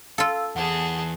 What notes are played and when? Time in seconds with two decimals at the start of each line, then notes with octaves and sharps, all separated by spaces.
0.18 F4 A4 F5 E6
0.56 E2 G#4 F#5 A5